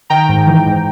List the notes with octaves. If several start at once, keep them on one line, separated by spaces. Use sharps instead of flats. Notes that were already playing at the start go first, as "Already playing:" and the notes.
D#3 G5 A#5
G#2
E3
G#2